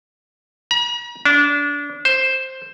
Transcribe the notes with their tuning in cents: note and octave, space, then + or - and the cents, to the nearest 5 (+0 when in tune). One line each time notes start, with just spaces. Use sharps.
A#5 +45
D4 -25
C5 +5